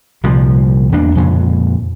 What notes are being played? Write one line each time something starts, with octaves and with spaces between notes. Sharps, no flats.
C2 A#2 F3 G3
E2 A#3 D4
F2 A#2 C#3